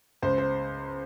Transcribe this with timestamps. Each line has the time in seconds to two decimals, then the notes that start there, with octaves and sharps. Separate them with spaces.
0.22 C#2 C5
0.38 C5